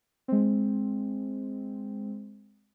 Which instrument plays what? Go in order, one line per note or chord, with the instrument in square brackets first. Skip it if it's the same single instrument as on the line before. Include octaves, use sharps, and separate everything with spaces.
[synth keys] G#3 C4